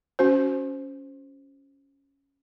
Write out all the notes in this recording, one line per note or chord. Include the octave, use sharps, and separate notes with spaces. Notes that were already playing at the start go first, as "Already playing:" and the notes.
C#4 F#4 C5